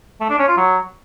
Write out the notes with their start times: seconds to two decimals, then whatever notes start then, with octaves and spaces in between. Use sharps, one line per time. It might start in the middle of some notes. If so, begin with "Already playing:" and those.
0.21 A3
0.30 D4
0.39 C#4
0.48 F4
0.57 F#3